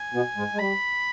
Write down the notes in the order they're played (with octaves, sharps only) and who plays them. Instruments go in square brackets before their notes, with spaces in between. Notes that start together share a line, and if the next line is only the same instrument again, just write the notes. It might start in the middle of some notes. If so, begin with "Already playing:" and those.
Already playing: [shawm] G#5
[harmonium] B2 B3
G#2 G#3
G#3
[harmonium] G3 [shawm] B5